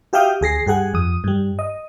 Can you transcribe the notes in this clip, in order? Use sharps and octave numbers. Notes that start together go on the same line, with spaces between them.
F#4 G4 E5 F5 G5 D#6
D2 G#4 A#6 C7
G2 G4 G#4 F#5 G#5
F2 D#6
G2 G3
D#5